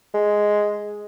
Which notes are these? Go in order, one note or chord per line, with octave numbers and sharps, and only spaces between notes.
G#3